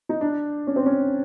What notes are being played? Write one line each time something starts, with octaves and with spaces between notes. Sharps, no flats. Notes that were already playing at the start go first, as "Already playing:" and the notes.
D#4
D4
C#4
C4
C#4